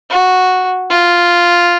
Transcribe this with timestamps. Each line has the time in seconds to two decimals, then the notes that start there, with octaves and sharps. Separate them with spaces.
0.10 F#4
0.90 F4